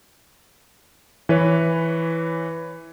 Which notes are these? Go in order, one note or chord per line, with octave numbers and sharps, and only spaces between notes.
E3 B4 C#5